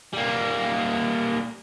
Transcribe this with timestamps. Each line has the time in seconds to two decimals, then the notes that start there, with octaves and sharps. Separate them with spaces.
0.13 G3 A#3